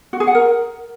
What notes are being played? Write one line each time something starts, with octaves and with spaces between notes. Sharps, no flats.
F#4
G#4
F#5
A#4